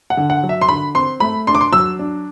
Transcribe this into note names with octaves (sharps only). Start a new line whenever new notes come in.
F#5
D3
F#5
F#3
E5
C6
D3 B5
C4 C6
A3 B5
D4 C6
D6
C6
F#3 E6
D4